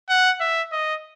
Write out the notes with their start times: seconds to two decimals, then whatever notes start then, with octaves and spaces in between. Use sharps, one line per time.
0.09 F#5
0.40 E5
0.72 D#5